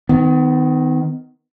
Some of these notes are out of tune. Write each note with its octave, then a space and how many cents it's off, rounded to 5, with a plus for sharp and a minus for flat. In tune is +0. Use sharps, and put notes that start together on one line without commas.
D#3 +0 B3 +40